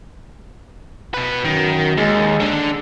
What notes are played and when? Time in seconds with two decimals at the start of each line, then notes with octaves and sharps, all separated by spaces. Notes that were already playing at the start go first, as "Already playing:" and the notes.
1.14 B2 B4
1.44 F#2 D#3
1.97 D#2 G#3
2.40 D3 D4